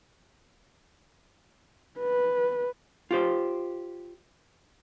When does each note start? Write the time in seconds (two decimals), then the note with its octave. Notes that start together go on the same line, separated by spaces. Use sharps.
1.99 B4
3.11 F4 G4 C5